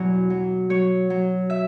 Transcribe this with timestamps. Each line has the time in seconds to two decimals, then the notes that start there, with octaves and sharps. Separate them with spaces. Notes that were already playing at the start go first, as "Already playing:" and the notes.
Already playing: E2 B2 F#3 F#4
0.30 F#3
0.70 F#3 C#5
1.10 F#3
1.50 E5